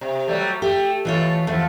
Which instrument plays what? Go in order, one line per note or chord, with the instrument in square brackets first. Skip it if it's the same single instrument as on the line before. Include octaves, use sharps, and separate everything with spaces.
[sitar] C3
F#3 G3 A3
[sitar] A3 [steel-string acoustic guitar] G4
[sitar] B2 A3 [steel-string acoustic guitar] E3 F4 C#5
[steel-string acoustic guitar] E2 [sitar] F3 A3